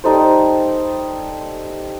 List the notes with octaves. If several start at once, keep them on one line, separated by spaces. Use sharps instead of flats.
G3 D#4 A4 C5